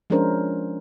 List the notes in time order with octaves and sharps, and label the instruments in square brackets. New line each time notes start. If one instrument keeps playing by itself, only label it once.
[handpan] F3 G#3 C#4 D4 A#4 C5